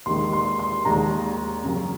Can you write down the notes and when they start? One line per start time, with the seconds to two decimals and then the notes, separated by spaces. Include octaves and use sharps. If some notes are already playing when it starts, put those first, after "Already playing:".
0.06 D#2 D#3 G#3 C6
0.33 C6
0.59 C6
0.85 D#2 D#3 G#3 A#5
1.64 F#2 C#3 F#3